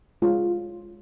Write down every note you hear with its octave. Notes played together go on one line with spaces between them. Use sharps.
G#3 F4 C#5